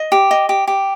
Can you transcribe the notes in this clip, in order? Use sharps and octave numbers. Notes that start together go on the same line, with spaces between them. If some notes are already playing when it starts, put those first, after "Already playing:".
Already playing: D#5
G4
D#5
G4
G4